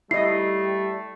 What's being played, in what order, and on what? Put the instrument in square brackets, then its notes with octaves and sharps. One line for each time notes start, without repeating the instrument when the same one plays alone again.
[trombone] G3 [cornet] A3 [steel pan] E4 D#5 [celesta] C7